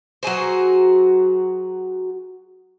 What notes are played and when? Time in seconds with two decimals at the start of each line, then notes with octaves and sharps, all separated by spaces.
0.23 F#3 F#4 G#4 C5